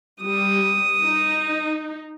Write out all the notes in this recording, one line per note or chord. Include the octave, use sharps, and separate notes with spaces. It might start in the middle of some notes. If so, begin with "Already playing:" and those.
G3 D#6
D#4